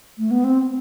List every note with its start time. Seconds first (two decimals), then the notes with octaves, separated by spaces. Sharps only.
0.18 A3
0.31 B3
0.44 C4